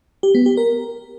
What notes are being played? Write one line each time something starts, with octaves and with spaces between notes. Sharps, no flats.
G4
B3
G4
A#4